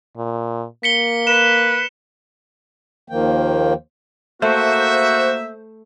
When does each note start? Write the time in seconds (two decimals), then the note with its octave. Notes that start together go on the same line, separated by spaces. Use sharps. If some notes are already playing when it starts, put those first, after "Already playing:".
0.16 A#2
0.83 A#3 B6 C#7 G7
1.27 B4 E7
3.09 D#2 D#3 F3 A#3 G5
4.42 A3 A#3 F#4 C5 E5